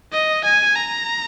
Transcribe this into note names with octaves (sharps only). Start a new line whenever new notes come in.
D#5
G#5
A#5